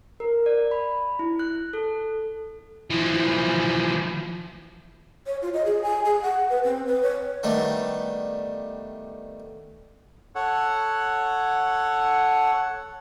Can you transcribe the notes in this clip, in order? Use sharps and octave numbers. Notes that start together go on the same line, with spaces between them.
A#4
D5
B5
E4
F#6
A4
E3 F3
C#5
F4
D#5
G#4
G#5
G#4
F#5
B4
C4
B4
C#5
D#3 G3 A3 B3 D4
A4 C#5 F#5